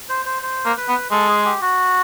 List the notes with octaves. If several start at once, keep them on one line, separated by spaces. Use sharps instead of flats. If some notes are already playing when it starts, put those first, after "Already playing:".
C5
C5
C5
A#3
B4
B3
G#3 A4
G#4
G4
F#4